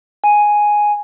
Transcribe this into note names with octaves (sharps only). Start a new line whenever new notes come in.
G#5